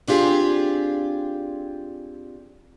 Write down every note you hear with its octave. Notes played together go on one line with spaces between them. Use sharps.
C4 D4 F4 G4 G#4